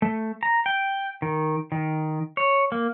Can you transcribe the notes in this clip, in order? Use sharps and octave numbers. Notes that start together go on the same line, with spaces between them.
A3
A#5
G5
D#3
D#3
C#5
A#3